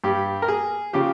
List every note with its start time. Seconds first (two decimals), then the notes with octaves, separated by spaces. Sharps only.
0.04 G2 G3 G4
0.42 A#4
0.48 G#4
0.93 C#3 F3 G4